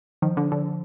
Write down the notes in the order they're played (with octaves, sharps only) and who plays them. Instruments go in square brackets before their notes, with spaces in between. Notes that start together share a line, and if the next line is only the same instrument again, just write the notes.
[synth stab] D#3 [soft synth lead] F3
[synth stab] D3
D3